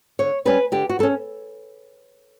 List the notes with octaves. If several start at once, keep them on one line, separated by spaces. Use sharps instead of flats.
D3 C#5
G3 C#4 B4
D3 G4
F#4
G3 A4
C#4